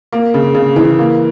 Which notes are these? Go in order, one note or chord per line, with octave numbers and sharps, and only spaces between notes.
A#3
C#3
C#3
E3
A#3